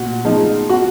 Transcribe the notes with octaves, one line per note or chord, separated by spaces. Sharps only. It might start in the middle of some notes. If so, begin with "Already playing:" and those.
Already playing: A#2 F#4
F3 G#3 D#4
F#4